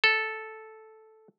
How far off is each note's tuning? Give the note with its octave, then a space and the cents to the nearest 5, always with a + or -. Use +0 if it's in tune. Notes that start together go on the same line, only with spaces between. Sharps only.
A4 -5